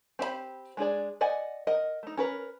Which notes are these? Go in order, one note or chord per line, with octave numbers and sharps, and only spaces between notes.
C4 G4 D#5 B5
G#3 D4 G#4 D5
D5 D#5 F#5 G#5
A#4 D#5 F#5
A3 D#4
C#4 A#4 B4